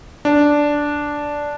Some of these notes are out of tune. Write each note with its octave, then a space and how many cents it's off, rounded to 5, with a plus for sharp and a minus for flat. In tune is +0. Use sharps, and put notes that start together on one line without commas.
D4 -5